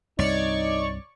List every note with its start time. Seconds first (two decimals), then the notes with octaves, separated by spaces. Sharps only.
0.19 C2 G2 D#4 C#5 D5 C#6